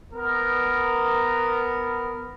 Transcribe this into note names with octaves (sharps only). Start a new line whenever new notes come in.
B3 A#4